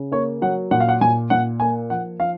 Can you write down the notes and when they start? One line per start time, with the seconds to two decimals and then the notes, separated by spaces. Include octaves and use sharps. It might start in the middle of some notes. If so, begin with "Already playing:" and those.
Already playing: C#3
0.12 A#3 C#5
0.42 F#3 F#5
0.71 A#2 F#5
0.80 F5
0.89 F#5
1.01 A#2 G#5
1.30 A#2 F#5
1.60 A#3 G#5
1.90 F3 F#5
2.20 F3 F5